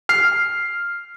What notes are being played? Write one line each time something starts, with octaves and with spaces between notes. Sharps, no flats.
F6 C7